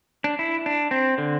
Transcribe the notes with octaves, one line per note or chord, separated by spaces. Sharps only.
D4
E4
D4
C4
D3